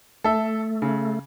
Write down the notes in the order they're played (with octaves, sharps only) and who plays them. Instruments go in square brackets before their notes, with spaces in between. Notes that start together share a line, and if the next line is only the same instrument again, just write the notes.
[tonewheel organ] A3 [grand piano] A4 E5
[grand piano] C#3